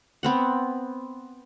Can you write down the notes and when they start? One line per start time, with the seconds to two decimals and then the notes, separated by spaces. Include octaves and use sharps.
0.23 B3 C4 F#5